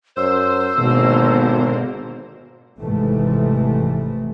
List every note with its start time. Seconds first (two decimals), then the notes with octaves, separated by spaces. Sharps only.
0.17 F#2 C5 E6
0.77 G#1 B2 D3 A#3
2.79 G#1 G#2 C3 E3 A3